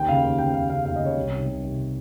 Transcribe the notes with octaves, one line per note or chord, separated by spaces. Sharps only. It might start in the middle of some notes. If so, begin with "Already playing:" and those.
Already playing: D#2 G5
C#3 F5
D#2
C#3 G5
D#2 F5
C#3 F5
D#2 F5
D#5
C#3 C#5
C2
C3 D#3
C2
C3 D#3